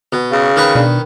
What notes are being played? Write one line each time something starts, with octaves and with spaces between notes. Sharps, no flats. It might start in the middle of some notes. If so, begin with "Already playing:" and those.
B2
C#3
D#3 B4 C#6
B2 D4